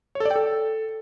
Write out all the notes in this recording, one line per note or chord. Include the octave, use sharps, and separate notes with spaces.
C#5
A4
D5
G5
A4